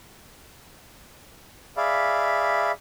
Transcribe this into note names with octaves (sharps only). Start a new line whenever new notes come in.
G#4 D5 E5 F5 B5